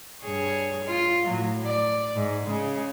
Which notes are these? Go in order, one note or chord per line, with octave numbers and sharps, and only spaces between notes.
G2 G#4 C#5
F4
A2 F#3
D5
G#2
C#3 G#3